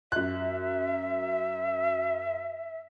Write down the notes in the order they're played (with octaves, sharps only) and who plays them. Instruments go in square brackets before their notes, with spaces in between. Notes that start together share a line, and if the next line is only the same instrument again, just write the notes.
[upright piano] F#2 F#6 [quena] E5